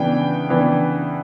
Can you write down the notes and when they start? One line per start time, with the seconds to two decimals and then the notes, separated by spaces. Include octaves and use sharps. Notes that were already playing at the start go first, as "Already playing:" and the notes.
Already playing: C#3 E3 B3 D4 G5
0.49 C#3 E3 B3 D4